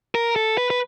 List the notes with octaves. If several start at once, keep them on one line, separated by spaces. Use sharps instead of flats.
A#4
A4
B4
B4